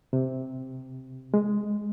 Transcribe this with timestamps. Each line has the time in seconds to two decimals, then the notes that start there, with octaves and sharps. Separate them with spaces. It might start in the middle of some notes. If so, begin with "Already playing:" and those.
0.13 C3
1.34 G#3